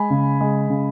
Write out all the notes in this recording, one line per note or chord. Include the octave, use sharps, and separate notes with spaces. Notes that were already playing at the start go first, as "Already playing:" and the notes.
Already playing: G#3 G#5 B5
C#3
G#3
C#3